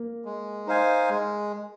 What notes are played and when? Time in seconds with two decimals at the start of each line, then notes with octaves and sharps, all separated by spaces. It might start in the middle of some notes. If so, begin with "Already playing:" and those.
Already playing: A#3
0.25 G#3
0.67 D#4 C5 F5 G#5
1.09 G#3